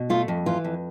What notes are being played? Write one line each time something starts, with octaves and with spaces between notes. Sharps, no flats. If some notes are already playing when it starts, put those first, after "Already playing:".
Already playing: B2
A3 F4
F2
E3 F4
F2